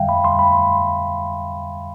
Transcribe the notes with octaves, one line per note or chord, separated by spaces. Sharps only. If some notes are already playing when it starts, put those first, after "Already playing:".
Already playing: F2 D3 G3 E5 F5 G5
B5
C6
B5